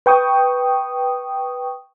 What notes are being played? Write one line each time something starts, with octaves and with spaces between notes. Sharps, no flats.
B4 G5 C#6 D#6